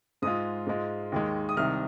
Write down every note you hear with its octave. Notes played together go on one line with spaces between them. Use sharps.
G#2 G#3 F4 D#6
G#2 G#3 F4
D#2 D#3 G#3
D#6
C2 C3 D#3 F6